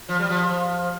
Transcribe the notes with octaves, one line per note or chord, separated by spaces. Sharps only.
F3
G3
F3